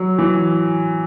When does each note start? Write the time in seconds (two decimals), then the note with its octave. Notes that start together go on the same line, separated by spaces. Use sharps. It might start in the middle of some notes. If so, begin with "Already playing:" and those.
Already playing: F#3
0.18 E3